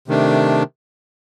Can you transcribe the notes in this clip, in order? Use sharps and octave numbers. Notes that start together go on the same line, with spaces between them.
C3 D#3 A3 D4